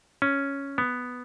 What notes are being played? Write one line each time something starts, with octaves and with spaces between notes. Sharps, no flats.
C#4
B3